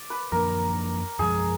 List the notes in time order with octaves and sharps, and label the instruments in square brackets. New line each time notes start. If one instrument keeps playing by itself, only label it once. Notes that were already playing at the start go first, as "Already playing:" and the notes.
Already playing: [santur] D5
B4
[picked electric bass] F#2 F3 A#3 D4 [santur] A#4
[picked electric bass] F#2 F3 G#3 [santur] G#4